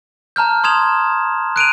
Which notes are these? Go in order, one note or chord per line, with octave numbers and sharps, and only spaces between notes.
A5 A#5 F6 G6
C6 D#6 G#6 E7 F7
F#6 D7 D#7 F7